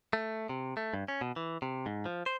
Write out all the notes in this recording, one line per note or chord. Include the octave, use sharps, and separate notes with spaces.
A3
C3
A3
G2
C#4
B2
E3
C3
G#2
F3
C5